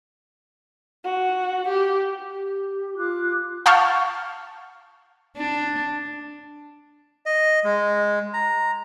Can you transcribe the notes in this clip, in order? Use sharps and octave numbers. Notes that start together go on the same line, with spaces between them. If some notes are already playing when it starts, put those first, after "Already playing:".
F#4
G4
G4
F4 D6 F#6
F5 F#5 A5 C#6 F6 G6
D4
D#5
G#3
A#5